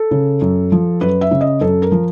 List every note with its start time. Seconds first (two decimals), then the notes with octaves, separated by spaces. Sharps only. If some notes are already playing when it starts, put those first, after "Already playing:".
Already playing: A4
0.11 C#3
0.42 F#2
0.72 F3
1.01 F#2 B4
1.21 E5
1.31 C#3
1.41 D#5
1.61 F#2 A4
1.82 A#4
1.92 F3